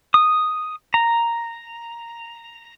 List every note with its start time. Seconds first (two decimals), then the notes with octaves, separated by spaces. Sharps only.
0.14 D#6
0.94 A#5